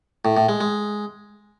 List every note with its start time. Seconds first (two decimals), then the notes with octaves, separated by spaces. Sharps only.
0.25 A2
0.37 A2
0.49 G#3
0.61 G#3